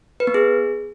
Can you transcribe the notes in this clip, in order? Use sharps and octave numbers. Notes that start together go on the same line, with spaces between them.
B4
B3
G#4